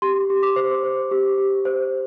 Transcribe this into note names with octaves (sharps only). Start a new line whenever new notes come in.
G4 C6
G4
D6
C5
C5
G4
G4
C5